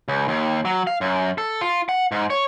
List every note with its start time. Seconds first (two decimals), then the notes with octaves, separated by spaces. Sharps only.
0.08 C#2
0.28 D#2
0.65 F#3
0.87 F5
1.01 F#2
1.38 A4
1.61 F4
1.89 F#5
2.12 G#2
2.30 C#5